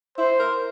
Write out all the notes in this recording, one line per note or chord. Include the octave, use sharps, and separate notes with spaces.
E4 C5
A#4